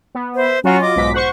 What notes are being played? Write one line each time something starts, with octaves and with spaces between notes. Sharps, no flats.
B3
C5 E5
F#3 C#4 F4 F#4 A#5
D#5 D6
B1 G#2 B6
C5 F#5 C#6